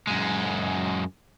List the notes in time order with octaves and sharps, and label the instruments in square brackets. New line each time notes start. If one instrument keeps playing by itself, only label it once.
[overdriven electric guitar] F#2 G#3